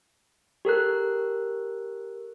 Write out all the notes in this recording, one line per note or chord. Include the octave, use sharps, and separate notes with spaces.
G4 A4 A#4 F#6